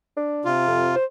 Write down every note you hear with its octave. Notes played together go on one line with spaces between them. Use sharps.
D4
C3 F4
F2
C5